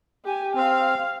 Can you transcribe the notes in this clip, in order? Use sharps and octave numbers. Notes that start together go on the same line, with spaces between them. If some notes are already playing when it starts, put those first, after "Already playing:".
G4 G#5
C4 F5